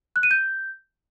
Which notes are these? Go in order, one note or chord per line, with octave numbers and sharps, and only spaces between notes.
F#6
D#7
G6